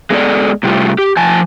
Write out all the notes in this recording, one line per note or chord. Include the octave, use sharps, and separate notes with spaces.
G#3 A#3 B3 E4 A4 D5
A2 C3 G3 A3 F4
G4
F3 G#5 A5